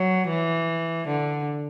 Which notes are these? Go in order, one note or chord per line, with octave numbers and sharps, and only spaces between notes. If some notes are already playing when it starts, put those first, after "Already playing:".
Already playing: F#3
E3
D3